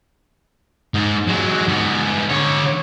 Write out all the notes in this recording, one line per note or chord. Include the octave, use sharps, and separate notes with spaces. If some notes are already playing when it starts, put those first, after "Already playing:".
G#2
F#3 G#3
G#2 B3
D3 C#5